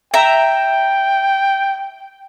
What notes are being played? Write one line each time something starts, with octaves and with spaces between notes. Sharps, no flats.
E5 G5 A#5